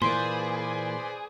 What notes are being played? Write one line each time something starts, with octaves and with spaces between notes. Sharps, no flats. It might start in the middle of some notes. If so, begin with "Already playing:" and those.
A#2 E3 A#3 G#4 B4 C5 D5 C6